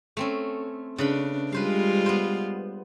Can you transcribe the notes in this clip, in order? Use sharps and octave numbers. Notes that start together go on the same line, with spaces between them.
A3 C4 C#4
C#3 D4 B4 B5
G3 G#3 F4 B4 C5 F5
B3 C5